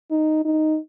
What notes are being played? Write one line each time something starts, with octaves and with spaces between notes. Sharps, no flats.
D#4
D#4